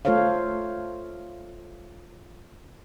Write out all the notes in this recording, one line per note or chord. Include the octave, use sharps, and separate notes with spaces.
A3 F4 A4 C5 C#5 F5